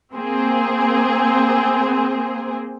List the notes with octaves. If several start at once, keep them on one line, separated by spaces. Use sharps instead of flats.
A#3 C4 G#4